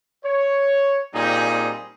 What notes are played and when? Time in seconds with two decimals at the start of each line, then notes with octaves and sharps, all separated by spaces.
0.24 C#5
1.14 A#2 G3 C4 D#4 G#4